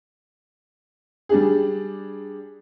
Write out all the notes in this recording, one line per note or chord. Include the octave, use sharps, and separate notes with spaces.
G3 D4 G#4